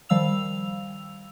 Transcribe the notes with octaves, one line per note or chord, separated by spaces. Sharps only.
D#3 F3 G3 F5 E6 F7